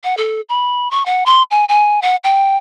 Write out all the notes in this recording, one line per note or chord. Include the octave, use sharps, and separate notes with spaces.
F#5
A4
B5
C#6
F#5
C6
G#5
G#5
F#5
G5